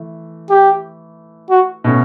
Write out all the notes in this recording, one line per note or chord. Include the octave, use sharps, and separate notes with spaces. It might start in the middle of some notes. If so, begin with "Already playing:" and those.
Already playing: E3 A3
G4
F#4
B2 A3 C#4